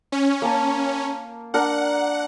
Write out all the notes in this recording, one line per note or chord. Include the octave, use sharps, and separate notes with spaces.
C#4
A#3 A5
D4 A#4 F#5